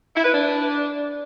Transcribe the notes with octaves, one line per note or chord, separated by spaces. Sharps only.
E4
B4
D4